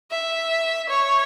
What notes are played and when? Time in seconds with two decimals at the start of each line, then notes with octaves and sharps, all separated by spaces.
0.11 E5
0.89 C#5